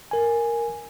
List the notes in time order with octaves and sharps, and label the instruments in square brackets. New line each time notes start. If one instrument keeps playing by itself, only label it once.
[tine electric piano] A#4 G#5